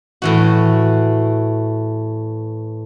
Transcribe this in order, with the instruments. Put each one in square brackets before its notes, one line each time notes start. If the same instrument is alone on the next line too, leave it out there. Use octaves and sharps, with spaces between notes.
[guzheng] A2 E3 F#4